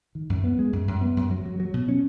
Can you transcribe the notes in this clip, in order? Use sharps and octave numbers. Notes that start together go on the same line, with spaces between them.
D#3
F#2
B3
G#3
F#2
F#2
B3
F#2
F#3
F#3
F#3
B2
C#4